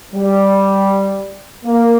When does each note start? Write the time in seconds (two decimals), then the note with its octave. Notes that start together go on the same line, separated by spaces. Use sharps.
0.14 G3
1.64 A#3